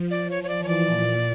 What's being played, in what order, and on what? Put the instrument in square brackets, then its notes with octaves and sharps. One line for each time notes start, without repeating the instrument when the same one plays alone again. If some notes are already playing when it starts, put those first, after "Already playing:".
Already playing: [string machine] F3
[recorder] D5
[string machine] F3 [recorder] C#5
[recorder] C#5
D5
[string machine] E3 [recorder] C#5
[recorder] D5
[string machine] A#2